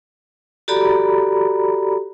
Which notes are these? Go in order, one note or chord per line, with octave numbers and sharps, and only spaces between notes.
F#4 G4 A4 D5 A#5 B5